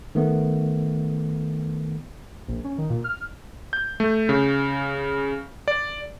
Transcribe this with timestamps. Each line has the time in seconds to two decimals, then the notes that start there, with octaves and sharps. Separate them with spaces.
0.15 D#3 A3 B3
2.48 A#1
2.64 C#4
2.78 D#3
2.90 A#2
3.04 F6
3.73 G6
4.00 A3
4.29 C#3
5.68 D5